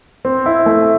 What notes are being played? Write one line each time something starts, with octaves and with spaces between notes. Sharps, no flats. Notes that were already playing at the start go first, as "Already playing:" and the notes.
C4
E4
A3